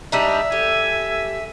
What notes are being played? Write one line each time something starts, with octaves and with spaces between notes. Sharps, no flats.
G3 D4 D#4 E5
G4 A4 G#5